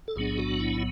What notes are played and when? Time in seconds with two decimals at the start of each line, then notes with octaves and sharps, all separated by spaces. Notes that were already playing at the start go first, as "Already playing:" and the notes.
0.08 A4
0.16 B1 A2 F#3 B3 D4 G#4
0.38 F#4
0.60 E4